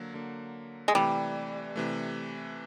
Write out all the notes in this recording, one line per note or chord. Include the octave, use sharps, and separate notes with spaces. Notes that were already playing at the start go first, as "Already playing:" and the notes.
Already playing: D3 F#3 A#3
D3 F#3 A#3
G#3
C3 E3 G3 A3
C3 E3 A3